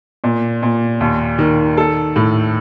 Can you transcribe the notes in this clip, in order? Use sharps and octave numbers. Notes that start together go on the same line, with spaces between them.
A#2
A#2
D#2
D#3
A4
A2